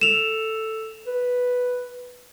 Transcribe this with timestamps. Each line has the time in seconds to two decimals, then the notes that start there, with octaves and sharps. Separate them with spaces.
0.01 A4 E7 F7
1.07 B4